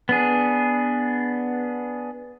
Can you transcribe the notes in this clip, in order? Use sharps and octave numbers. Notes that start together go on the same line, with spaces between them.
B3 D4 G#4